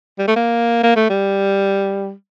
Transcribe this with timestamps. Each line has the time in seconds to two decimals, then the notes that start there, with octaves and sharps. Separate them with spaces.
0.19 G3
0.28 A3
0.36 A#3
0.83 A#3
0.96 A3
1.10 G3